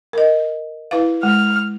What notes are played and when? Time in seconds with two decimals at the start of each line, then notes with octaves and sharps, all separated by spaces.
0.13 A#4 D#5
0.91 E4 B4 F5
1.23 G#3 F6